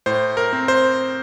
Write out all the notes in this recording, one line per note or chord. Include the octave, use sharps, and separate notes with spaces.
A2 C5
A#4
C4
C5